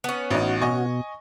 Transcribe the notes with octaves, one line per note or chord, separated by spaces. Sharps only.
B3 C#4
A1 D#4 F#4
B2 D#5 G#5 C#6